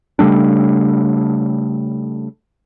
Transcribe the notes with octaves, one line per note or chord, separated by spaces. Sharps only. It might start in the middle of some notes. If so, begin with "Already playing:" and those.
C#3 G3 A3 D4